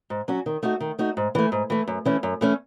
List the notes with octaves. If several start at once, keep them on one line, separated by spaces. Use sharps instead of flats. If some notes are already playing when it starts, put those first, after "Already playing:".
G#2
F#3 C#4 F#4
D#3
A3 D#4 F#4
D#3
A3 D#4 F#4
G#2
E3 A3
G#2
E3 A3
F#2
E3 A3 C#4
F#2
E3 A3 C#4